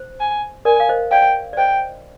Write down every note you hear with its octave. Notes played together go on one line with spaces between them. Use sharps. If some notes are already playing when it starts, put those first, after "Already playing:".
Already playing: C5
G#5
A#4 D5 G#5
F5
C5 D#5
D5 F5 G5
D5
C5 D#5 G5